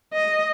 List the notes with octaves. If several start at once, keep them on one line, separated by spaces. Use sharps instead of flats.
D#5